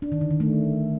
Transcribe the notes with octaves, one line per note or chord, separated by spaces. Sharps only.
D4
D#3
D3
D#3
A3